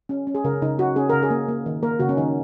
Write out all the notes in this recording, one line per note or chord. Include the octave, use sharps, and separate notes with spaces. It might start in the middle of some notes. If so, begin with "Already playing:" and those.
C#4
C#4
G#4
C#3 A#4
C#3 D#4
C#4 F#4
C#4 G#4
C#3 A#4
G#4
A#3
A#3
D#3
A#3 A#4
C#3 F#4
C#4
D#3 D#4